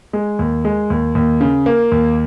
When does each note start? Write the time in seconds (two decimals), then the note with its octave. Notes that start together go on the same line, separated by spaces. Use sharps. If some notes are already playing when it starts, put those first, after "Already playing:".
0.13 G#3
0.39 D#2
0.65 G#3
0.90 D#2
1.15 D#2
1.41 C#3
1.66 A#3
1.92 D#2